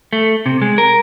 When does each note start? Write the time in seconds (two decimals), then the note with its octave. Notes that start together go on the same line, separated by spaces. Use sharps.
0.13 A3
0.46 C3
0.62 G#3
0.78 A#4